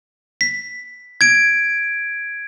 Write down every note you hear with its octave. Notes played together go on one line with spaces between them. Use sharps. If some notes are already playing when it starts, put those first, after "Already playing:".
B6
G#6 D7